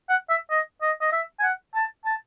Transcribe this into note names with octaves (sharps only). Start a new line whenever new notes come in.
F#5
E5
D#5
D#5
D#5
E5
G#5
F#5
A5
A5